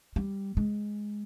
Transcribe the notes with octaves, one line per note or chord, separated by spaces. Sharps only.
G3
G#3